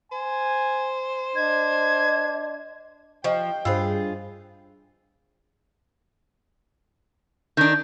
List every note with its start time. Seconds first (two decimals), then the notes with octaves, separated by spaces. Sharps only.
0.12 C5 G#5
1.36 D4 D#5 G#6
3.24 F3 G4 D#5 G5
3.65 G2 F4 G#4 C5 B5 E6
7.57 D#3 D4 G6